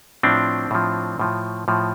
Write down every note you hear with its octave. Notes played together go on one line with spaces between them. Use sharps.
A2 F3 C4 D4
A2 F3
A2 F3
A2 F3